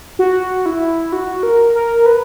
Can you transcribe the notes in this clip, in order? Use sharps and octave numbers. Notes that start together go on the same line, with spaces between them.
F#4
E4
F#4
A#4
A#4
B4